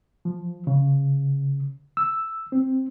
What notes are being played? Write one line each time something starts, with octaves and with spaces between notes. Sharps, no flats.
F3
C#3
E6
C4